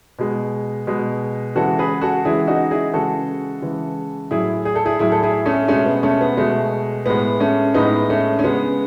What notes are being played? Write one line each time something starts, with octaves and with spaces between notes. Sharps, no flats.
B2 G#3
B2 G#3
C#3 E3 G#3 F#4 A4
G#4 B4
F#4 A4
C#3 E3 G#3 E4 G#4
D#4 F#4
E4 G#4
C#3 E3 G#3 F#4 A4
C#3 E3 G#3
A2 F#3 E4 G#4
G#4
A4
E4 G#4
A2 F#3 E4 G#4
A4
E4 G#4
A3 C#4
B2 G#3 A3 C#4
B3
A3 C#4
B3
B2 G#3 A3
A2 G#3 B3
A3 C#4
A2 G#3 B3 D#4
A3 C#4
C#4
C#3 G#3 B3